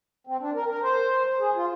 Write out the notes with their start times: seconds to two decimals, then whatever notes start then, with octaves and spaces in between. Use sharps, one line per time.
0.27 C4
0.41 D4
0.54 A#4
0.69 A#4
0.83 C5
1.40 G#4
1.56 F4